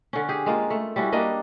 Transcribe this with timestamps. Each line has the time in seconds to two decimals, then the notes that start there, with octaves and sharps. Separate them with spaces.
0.13 D3 C#4
0.29 G4 G#4
0.46 G#3 A#3 F4
0.70 A3
0.96 G3 C#4 E4 F#4
1.12 G3 A#3 D4 D#5